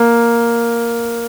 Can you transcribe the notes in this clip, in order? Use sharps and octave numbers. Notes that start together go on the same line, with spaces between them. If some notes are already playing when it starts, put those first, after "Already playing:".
Already playing: A#3